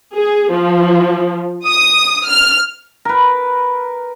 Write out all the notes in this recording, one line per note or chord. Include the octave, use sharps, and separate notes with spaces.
G#4
F3
D#6
F6
A#4 B4